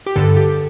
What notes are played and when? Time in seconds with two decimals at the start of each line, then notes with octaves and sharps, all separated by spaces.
0.06 G4
0.16 G2 D3 A4
0.37 G4